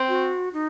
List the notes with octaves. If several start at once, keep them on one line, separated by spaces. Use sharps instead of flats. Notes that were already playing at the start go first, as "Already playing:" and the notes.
Already playing: C4
F#4
D#4